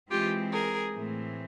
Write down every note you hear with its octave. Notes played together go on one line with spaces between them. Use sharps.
E3 G#3 C4 F4 G4
G#4 A#4
A2 E3 A3 C4